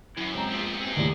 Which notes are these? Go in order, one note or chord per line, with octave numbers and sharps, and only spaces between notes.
F#2 E3
G#3 C4 A#5
A#2 F3 B3 C4
A#2 C4 D#4 G#4
D#2 A2 D#3 G4 D5